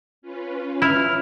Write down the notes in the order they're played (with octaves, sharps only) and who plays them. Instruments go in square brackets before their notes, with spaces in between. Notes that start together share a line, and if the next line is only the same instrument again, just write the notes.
[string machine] C#4 F4 B4
[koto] E4 [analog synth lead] F6